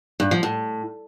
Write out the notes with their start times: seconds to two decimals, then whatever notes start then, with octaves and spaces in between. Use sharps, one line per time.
0.20 G2
0.31 F3
0.43 A2